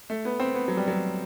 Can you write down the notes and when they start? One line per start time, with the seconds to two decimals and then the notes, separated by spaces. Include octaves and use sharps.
0.10 A3
0.25 B3
0.40 C4
0.55 B3
0.68 F#3
0.77 G3
0.88 F#3